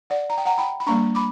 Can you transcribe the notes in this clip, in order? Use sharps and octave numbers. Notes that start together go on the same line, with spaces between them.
D5 F#5
A#5
G5
F#5 A#5
G5 B5
B5
G3 A#3 D4 A#5 C#6
B5 D6